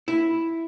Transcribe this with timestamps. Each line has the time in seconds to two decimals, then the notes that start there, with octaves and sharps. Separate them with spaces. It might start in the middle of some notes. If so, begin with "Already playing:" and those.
0.08 E4